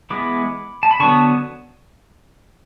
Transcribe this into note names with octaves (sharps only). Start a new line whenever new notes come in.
E3 G#3 B3 B5 D6
A5
B5
D3 F#3 B3 A5 C#6